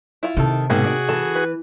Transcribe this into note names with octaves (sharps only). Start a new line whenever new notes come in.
E4 F4
C3 D#3 A4
G#2 B2 D#3 A#3 C4 F#4 G#4
D5
E3 A4
B4